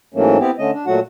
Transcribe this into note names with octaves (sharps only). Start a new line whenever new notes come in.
G#2 E3 F#3 A3 A#3 C#4
B3 C4 E4 G4
D3 A3 C#4 D#5
D4
A#2 F#3 A3 F#4 F#5